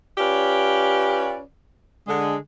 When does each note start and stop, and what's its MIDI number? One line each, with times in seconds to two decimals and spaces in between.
0.18 1.40 61
0.18 1.40 65
0.18 1.40 67
0.18 1.40 71
0.18 1.40 74
2.08 2.36 50
2.08 2.36 56